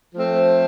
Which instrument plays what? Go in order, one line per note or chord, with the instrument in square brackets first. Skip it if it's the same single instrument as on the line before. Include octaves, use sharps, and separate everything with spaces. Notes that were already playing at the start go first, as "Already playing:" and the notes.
[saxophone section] F3 A3 C4